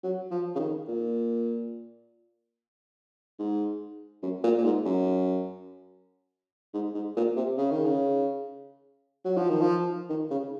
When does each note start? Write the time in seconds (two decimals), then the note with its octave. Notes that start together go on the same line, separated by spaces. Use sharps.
0.04 F#3
0.31 F3
0.56 C#3
0.59 D#3
0.88 A#2
3.39 G#2
4.23 F#2
4.44 A#2
4.58 A#2
4.64 G#2
4.85 F#2
6.74 G#2
6.95 G#2
7.17 A#2
7.37 C3
7.58 C#3
7.71 D#3
7.86 C#3
9.25 F#3
9.37 F3
9.49 D#3
9.61 F3
10.10 D#3
10.30 C#3